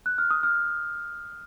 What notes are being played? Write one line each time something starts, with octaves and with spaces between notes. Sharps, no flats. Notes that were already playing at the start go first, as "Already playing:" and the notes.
F#6
F6
D#6
F6